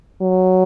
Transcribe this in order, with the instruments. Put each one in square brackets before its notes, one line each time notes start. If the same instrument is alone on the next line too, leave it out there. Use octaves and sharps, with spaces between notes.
[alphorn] F#3